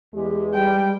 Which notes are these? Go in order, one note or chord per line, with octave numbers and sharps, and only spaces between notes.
E2 G#3 G4
G3 G5